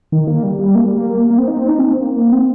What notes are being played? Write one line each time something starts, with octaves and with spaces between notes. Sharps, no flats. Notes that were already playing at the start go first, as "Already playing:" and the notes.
D#3
A#3
G3
G3
A#3
G3
A#3
A#3
C4
D#4
C4
D#4
C4
C4
A#3
A#3
C4